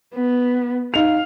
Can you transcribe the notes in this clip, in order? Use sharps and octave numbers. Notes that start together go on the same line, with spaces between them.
B3
D#4 F5 F7